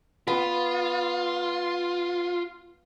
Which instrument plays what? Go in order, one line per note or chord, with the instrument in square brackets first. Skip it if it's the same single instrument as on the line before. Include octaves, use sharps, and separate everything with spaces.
[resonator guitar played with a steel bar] B3 [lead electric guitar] F4